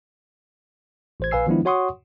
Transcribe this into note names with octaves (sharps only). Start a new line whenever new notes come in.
A1 C5 G#6
A#1 B4 F5 G#5 E6 C7
D#3 F3 G#3 B3 D4 E4
F#4 C#5 F#5 C6 C#6 D#6